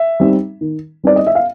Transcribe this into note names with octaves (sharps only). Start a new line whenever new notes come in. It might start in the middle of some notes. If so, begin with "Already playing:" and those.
Already playing: E5
G3 C4 D#4
D#3
G3 C4 D#4 D5
D#5
E5
F5